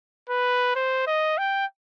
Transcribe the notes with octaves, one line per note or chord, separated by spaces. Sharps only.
B4
C5
D#5
G5